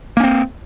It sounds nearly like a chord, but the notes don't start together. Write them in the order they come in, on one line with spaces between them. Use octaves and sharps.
A#3 C#4 C4